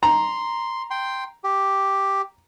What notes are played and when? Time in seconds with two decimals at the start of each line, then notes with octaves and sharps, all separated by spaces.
0.03 A#5 C6
0.90 G5 C6
1.44 G4